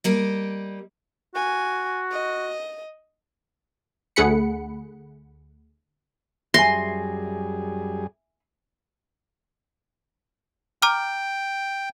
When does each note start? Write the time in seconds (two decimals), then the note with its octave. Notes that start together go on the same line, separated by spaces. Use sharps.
0.04 G3 A#3 D#5
1.35 F#4 G#5
2.12 D#5
4.16 D2 A3 G#4 F#5 B5 C#7
6.54 F#2 G3 G#4 E5 G#5 C6 A#6
10.82 G5 A#5 D6 F6